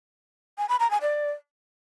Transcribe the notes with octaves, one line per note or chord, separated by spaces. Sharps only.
G#5
B5
A#5
G#5
D5